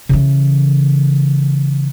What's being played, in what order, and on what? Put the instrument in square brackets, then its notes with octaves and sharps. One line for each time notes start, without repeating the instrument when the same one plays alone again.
[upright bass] C#3 E3